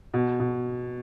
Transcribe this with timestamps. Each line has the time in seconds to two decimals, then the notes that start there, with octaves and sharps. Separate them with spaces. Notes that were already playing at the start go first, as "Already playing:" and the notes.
0.14 B2
0.40 B2